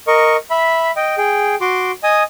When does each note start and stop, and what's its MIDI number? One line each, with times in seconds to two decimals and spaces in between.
0.07 0.36 70
0.07 0.36 75
0.07 0.36 85
0.50 0.91 76
0.50 0.91 83
0.96 1.15 75
0.96 1.15 79
1.18 1.55 68
1.18 1.55 79
1.61 1.92 66
1.61 1.92 84
1.61 1.92 86
2.03 2.23 75
2.03 2.23 80
2.03 2.23 87